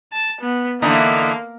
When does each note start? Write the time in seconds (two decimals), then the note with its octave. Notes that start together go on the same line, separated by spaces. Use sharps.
0.13 A5
0.41 B3
0.82 D3 E3 A#3 D#4